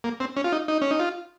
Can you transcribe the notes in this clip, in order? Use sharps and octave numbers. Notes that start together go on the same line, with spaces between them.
A#3
C4
C#4
F4
D#4
D#4
C#4
D#4
F4